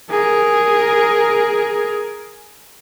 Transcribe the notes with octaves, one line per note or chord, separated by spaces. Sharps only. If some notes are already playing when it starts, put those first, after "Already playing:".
G#4 A#4